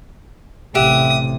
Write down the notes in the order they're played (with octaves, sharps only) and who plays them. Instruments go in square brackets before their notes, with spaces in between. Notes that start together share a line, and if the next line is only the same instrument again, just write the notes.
[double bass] A1 C3 [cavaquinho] G4 E5 F#5 [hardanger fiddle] D#6